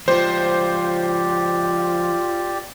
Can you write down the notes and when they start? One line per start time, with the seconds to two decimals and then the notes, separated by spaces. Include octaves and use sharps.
0.08 F3 G#3 F4 G4 C5 D5